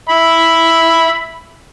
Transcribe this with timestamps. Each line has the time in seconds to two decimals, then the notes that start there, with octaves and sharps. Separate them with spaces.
0.10 E5 B5